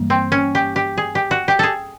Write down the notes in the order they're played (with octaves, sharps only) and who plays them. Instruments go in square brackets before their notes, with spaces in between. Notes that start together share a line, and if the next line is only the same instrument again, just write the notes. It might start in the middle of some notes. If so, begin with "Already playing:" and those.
Already playing: [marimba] G2 E3 G3 A#3
[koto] C4
C#4
G4
G4
G#4
G4
F#4
G4
G#4 A4